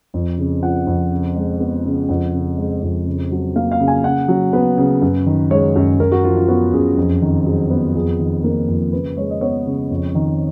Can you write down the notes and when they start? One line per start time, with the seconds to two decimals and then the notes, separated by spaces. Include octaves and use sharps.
0.14 F2
0.38 C#3
0.63 F3 F#5
0.87 F2
1.11 C#3
1.36 G#3
1.60 B3
1.85 C#3
2.09 F2 F#5
2.33 C#3
2.58 G#3
2.82 F2
3.07 C#3
3.31 F#3
3.56 A#3 F5
3.72 F5
3.80 C#3
3.88 G#5
4.04 C#3 F#5
4.28 F#3
4.53 B3 B4
4.78 C#3
5.02 F#2
5.26 D#3
5.51 G#3 C#5
5.76 F#2
6.00 F#2 A#4
6.12 F#4
6.24 F3 F4
6.37 F4
6.48 B3 F#4
6.73 F#2 G#4
6.97 F2
7.22 D#3
7.46 F#3 G#4
7.70 B3
7.95 F2 G#4
8.19 D#3
8.44 A#3 A#4
8.68 F2
8.93 C#3 B4
9.17 G#3 C#5
9.30 D#5
9.41 B3 C#5
9.66 C#3
9.90 F2
10.15 D#3